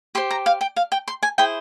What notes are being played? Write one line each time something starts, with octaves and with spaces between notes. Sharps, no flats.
G4 C5 C6
A#5
F5
G5
F5
G5
C6
G#5
E4 G#4 C5 G5